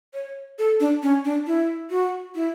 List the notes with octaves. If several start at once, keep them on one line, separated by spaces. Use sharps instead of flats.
C#5
A4
D4
C#4
D4
E4
F#4
E4